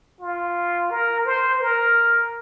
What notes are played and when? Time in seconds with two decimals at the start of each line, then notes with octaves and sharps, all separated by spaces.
0.21 F4
0.90 A#4
1.26 C5
1.61 A#4